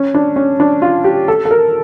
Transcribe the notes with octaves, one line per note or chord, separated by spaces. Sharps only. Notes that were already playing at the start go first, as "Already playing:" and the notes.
Already playing: C#4
D4
C#4
D4
F4
G4
A4
A4
A#4